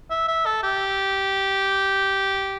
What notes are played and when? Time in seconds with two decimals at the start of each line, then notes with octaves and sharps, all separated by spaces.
0.10 E5
0.28 E5
0.46 A4
0.63 G4